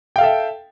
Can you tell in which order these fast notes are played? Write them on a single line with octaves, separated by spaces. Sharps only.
G5 F5 A4 E5